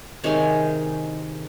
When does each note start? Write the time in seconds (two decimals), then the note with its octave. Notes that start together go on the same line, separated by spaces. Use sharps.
0.24 C3 D#3 G#3 D#4 C#5